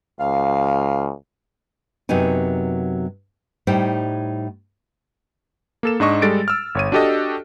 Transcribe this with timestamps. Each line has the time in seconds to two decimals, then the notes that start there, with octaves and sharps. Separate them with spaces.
0.20 C#2 F5
2.09 F#2 C3 F#3 B3 D#4 G#5
3.67 A2 G3 D#4 C5 G5
5.83 A#3 A4 E7
6.00 G#2 D4 D#5 C#6
6.22 G3 G#3 A4 A6 D7
6.48 E6 F6
6.75 G1 C#5 D#7
6.92 D4 F#4 G4 A4 D#5